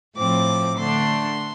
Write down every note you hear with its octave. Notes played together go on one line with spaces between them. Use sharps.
A2 F3 C4 D6
D3 A3 D4 C6